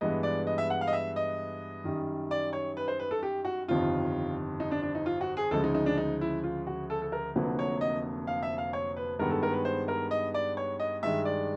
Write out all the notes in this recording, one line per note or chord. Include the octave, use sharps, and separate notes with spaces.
G2 E3 G#3 B3 D#5
D5
D#5
E5
F#5
F5
D#5
E5
D#5
F#2 D#3 G3
D5
C#5
B4
C5
B4
A4
G4
F#4
G1 F2 C3 D#3 G3 F4
D#4
D4
D4
D#4
F4
F#4
G#4
D2 C#3 F3 G#3 A4
D#4
D#4
D4
D#4
E4
F4
F#4
A4
A4
A#4
F1 F2 D3 F#3 A#3 B4
C#5
D#5
F5
E5
F5
C#5
B4
G2 D#3 G#3 B3 A#4
A4
A#4
B4
C5
A#4
D#5
D5
C#5
D#5
G2 D#3 G#3 E5
D5